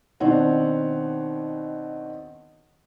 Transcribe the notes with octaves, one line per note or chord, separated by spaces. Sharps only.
B2 D#3 C4 D4 C#5 F#5